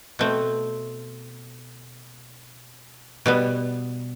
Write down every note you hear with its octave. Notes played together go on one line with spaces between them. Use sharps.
B2 A3 C4
B2 G3 B3